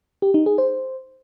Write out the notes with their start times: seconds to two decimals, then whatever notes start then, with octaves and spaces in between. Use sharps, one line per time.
0.22 G4
0.34 D#4
0.46 G#4
0.58 C5